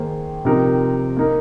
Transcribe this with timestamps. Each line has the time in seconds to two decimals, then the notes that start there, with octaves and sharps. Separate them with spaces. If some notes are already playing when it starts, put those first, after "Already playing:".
Already playing: D#3 A#3 G#4 C5
0.45 C3 F3 C4 D#4 A#4
1.17 A#3 D#4 A#4